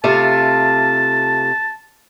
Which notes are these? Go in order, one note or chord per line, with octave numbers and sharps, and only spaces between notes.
C3 A3 F4 A5